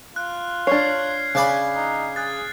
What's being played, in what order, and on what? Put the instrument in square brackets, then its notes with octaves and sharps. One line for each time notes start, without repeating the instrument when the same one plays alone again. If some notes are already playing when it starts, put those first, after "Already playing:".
[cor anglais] F4 [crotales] F#6
[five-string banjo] D4 C#5 [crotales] F6 G#6 C7
[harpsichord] C#3 D5 B5 [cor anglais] G#5
[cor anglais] D#4
[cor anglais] G#4 [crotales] F#6 A6